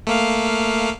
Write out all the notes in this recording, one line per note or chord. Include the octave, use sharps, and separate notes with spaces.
A3 A#3 F5